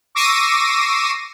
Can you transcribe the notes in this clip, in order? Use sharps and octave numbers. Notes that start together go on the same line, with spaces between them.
C#6 D6 E6 A#6 C7 D#7